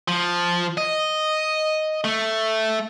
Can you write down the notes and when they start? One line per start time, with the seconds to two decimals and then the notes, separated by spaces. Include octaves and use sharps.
0.08 F3
0.77 D#5
2.04 A3